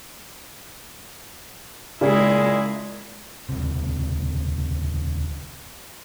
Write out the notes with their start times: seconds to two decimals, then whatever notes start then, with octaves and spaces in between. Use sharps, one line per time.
2.01 A#2 C#3 G#3 E4 G#4
3.49 D#1 C#2 C3